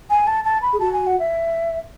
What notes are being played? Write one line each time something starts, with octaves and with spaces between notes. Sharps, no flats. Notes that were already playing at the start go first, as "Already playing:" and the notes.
G#5
A5
A5
B5
G#4
F#4 A5
G#5
F#5
E5